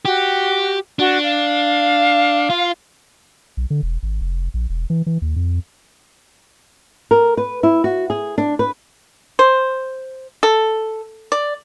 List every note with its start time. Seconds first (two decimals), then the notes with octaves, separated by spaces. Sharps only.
0.05 F#4 G4
0.99 D4 F#4
1.23 F5
2.50 F4
3.57 B1
3.70 D3
3.83 E1
4.03 G#1
4.21 F1
4.54 A#1
4.69 E1
4.90 E3
5.06 E3
5.22 D#2
5.36 F2
7.11 A#4
7.37 B4
7.63 E4
7.84 F#4
8.10 G#4
8.38 D4
8.59 B4
9.39 C5
10.43 A4
11.32 D5